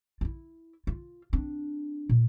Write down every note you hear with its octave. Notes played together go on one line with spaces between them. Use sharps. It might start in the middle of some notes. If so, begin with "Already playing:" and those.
E4 F4
F4
C4 D4
A#2